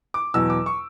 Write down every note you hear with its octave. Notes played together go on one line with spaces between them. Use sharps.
D6
E2 B2 F#3 E6
D6
C#6